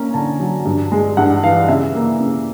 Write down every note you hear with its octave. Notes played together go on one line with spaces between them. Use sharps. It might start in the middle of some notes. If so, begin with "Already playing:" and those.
Already playing: A#3 C#4 A#5
D3 A5
F#3
G2
G#3
G2 F#5
E3 F5
C#3 E5
A#3
C#3